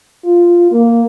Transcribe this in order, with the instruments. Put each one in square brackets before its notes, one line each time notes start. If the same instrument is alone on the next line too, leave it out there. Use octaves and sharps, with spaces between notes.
[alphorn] F4
A#3